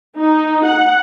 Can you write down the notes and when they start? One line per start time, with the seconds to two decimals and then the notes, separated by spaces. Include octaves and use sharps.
0.17 D#4
0.65 F#5